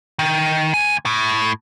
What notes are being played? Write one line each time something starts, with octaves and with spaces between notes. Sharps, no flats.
D#3
D2 G#5
A2